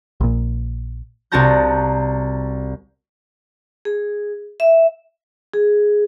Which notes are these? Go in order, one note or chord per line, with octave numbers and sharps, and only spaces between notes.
A#1 A#2
C2 C4 F#4 A5 A#5 G6
G#4
E5
G#4